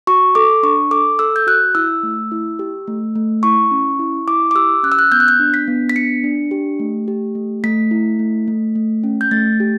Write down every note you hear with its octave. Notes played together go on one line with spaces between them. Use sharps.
F#4 C#6
A4 D6
D4 C#6
A4 D6
A4 E6
G6
F#4 F#6
E4 E6
A3
E4
G4
A3
A3
E4 C#6
C#4
E4
E4 D6
D6
G4 E6
C#4 F#6
E6
F#6
B3 G6
F#6
G6
D4
B6
B3
B6
D4 C#7
D4
G4
A3
G4
A3
A3 B6
E4
A3
A3
A3
C#4
G6
A3 A6
G4